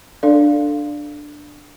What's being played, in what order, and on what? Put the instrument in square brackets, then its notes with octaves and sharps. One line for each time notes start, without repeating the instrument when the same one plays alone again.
[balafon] D4 A4 D5 F5